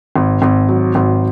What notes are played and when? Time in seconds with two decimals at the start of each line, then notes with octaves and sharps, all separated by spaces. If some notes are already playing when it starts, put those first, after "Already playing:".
0.16 G#1
0.42 G#1
0.69 F#3
0.95 G#1